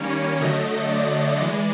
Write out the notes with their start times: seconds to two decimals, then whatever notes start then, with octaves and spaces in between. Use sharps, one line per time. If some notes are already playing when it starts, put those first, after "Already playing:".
Already playing: D#3 G3 A#3 C#4 C#5
0.41 D3 F#3 A3 D#5
0.90 D5
1.41 E3 G#3 D5